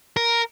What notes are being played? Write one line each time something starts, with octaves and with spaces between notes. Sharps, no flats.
A#4